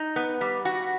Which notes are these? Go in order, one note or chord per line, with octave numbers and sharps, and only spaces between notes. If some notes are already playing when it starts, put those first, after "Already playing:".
Already playing: D#4
B3
G3
F#4